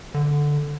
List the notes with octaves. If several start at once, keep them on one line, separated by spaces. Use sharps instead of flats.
D3